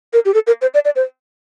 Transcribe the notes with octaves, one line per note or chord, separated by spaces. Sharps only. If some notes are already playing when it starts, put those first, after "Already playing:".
A#4
G4
A4
A#4
C5
D5
D5
C5